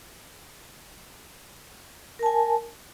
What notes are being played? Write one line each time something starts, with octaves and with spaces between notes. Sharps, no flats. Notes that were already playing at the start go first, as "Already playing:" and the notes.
A#4 G#5 A5